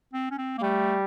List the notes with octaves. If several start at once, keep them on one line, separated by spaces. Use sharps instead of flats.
C4
C#4
C4
A#3
G3 A3